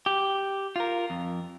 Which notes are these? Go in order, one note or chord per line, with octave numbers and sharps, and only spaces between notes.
G4
F4 A#4
F2